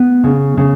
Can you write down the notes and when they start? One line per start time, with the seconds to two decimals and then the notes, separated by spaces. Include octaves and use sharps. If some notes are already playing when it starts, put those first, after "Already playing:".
Already playing: B3
0.24 C#3
0.57 C#3